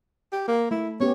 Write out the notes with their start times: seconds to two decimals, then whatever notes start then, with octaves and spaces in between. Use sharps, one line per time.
0.32 G4
0.48 A#3
0.71 A3 E4
1.00 B3 C#4 G4 C#5